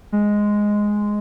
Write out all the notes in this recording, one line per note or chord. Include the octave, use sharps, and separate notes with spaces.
G#3